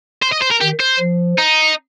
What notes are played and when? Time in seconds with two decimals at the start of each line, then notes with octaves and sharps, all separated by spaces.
0.23 C5
0.32 D#5
0.42 C5
0.51 A#4
0.61 D#3 G4
0.80 C5
0.99 F3
1.38 D#4